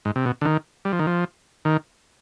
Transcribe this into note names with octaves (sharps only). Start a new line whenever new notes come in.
G#2
C3
B2
D3
D#3
G3
F3
D#3
F3
D#3